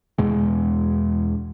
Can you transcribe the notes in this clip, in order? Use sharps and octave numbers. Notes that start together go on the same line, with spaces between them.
E2 B2 G#3